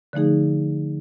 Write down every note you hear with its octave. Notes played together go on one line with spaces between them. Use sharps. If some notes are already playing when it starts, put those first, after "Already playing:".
D3 F3 A3 D#4 G#4